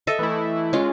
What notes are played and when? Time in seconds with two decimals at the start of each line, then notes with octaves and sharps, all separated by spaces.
0.07 A4 D#5 E5
0.19 E3 A3 E4
0.73 G#3 C#4 F4